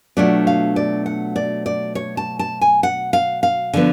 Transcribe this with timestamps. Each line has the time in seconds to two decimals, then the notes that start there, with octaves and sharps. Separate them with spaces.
0.17 B2 F#3 A3 D4 F4 D5
0.47 F5
0.76 D5
1.06 F#5
1.36 D5
1.66 D5
1.95 C#5
2.17 A5
2.39 A5
2.61 G#5
2.83 F#5
3.13 F5
3.43 F5
3.73 D3 F3 B3